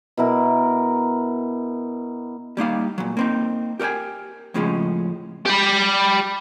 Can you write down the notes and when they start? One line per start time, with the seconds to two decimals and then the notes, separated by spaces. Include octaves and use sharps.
0.17 B2 E4 A#4
2.57 G3 A#3 D#4 F5
2.98 A#2 F#3
3.17 A#3 C4 D#4
3.79 G4 A#4 D5 G5 G#5
4.54 F2 A2 C#3 F3 G#3 C#4
5.46 G4 B5